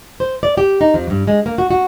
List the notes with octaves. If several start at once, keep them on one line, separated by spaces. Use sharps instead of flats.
C5
D5
G4
D#4
F2
G2
G#3
A#3
F#4
F#4